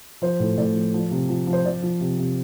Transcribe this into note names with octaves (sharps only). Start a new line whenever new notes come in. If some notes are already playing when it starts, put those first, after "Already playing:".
F3 C5
A2
A2 D5
F3
F3
C3
F3
F3
C5
F3 D5
F3
C3
C3